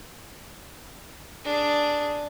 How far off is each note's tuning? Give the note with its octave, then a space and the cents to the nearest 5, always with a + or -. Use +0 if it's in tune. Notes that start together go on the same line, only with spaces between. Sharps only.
D4 +0 G#4 +5